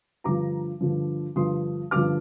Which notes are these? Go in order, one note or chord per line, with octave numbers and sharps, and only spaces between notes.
G2 D3 F3 A#5 D6
G2 D3 F3
G2 D3 F3 C6 D#6
G2 D3 F3 D6 F6